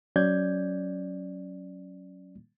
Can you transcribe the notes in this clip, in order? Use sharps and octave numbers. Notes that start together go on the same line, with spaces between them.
F#3 C#4 D5 G6 G#6